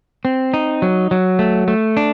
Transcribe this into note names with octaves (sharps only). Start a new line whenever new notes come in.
C4
D#4
F#3
F#3
A3
A3
D4